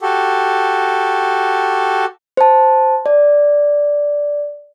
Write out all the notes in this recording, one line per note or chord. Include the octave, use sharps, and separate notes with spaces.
F#4 G4 A4
C5 A5
D5